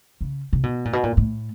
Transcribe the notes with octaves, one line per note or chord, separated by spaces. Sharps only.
C#3
C3
B2
A#2
B2
A#2
A2